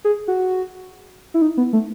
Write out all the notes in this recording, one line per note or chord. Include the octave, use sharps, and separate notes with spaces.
G#4
F#4
E4
D#4
B3
A3